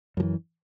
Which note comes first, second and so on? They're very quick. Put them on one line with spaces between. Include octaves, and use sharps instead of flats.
F#2 F3 E3